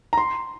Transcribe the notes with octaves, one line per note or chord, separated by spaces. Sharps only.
A#5
C6